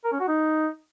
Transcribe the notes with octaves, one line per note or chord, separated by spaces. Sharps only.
A#4
C#4
F#4
D#4